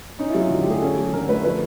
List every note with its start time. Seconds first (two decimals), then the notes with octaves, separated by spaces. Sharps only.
0.19 C#4 D#4
0.29 E4
0.34 F#3
0.40 F4
0.50 D3 F#4
0.61 G4
0.66 A3 G#4
0.82 C#4 A4
0.97 F#3
1.13 D3 A#4
1.28 A3 B4
1.44 F3 B4